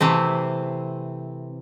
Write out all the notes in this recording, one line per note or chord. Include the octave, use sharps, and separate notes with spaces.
C3 E3 A3 C4